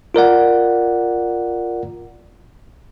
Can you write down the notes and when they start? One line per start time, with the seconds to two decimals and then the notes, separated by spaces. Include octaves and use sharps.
0.14 F4 A#4 D5 F#5